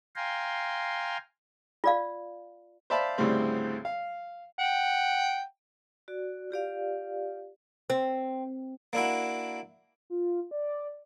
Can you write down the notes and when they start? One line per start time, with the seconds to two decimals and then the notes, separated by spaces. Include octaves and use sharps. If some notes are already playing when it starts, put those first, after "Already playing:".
0.16 F5 G5 G#5 A#5 C6
1.84 F4 D5 F5
2.90 C5 D5 E5 F5 A5 B5
3.18 D2 A2 C#3 G3 C4
3.85 F5
4.59 F#5 G5
6.08 F#4 D5
6.51 F4 G4 D5 F5
7.90 C4
8.93 A#3 D4 E4 F#4
10.10 F4
10.51 D5